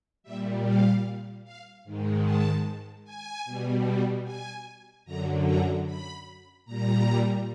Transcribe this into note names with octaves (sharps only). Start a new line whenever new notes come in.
A#2 G3 E5
F5
F5
G#2 D#3 G#3
A5
G#5
B2 G3
G#5
F#2 D3 F#3 A#5
A#5
B5
A#2 G3 A#5